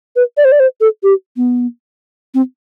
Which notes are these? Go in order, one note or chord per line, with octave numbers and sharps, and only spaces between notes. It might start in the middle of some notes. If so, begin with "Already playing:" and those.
B4
D5
C5
D5
C5
A4
G4
B3
C4